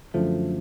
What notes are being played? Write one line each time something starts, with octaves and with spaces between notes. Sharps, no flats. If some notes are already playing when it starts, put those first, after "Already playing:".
F#2 D3 F3 A3